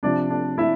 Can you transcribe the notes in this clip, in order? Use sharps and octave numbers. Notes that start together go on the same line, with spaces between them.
C3 F3 D4 D5
D4 D5
E4 E5